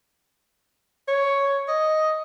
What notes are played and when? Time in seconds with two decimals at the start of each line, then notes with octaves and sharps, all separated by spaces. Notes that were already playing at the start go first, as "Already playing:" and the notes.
1.08 C#5
1.68 D#5